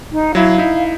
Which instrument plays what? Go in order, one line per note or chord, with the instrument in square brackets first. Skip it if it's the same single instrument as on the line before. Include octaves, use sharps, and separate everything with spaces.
[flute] D#4
[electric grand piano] F#3 E4 [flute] F5
[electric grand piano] D#4 E4